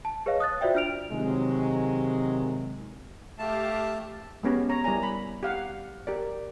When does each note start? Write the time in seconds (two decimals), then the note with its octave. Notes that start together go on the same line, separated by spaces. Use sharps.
0.05 A5
0.26 G#4 B4 C#5 D#5 F5
0.40 D#6 F#6 A6
0.61 F4 F#4 C5 D5 E5 G5
0.75 D4 F4 F6 D7 F7
1.12 C3 D#3 F#3 G#3
3.39 A3 G4 F5 A5
4.43 G#3 B3 C#4 G4
4.69 C#5 A#5
4.84 G3 E4 A#4 D5 G#5 A#5
5.03 B5
5.43 G4 F5 F#5
6.07 G4 A#4 D5